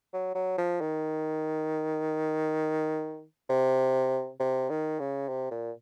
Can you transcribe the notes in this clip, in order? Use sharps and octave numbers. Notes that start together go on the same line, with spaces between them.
F#3
F#3
F3
D#3
C3
C3
D#3
C#3
C3
A#2